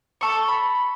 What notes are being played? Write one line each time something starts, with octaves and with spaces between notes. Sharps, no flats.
A4 C#6
B5